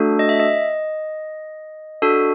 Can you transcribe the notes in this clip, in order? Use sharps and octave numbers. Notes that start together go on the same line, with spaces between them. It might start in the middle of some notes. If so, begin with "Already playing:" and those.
Already playing: A3 D4 F#4 A4
D#5
E5
D#5
D4 F#4 A4